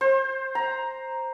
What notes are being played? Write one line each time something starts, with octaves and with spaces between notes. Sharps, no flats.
C5
A#5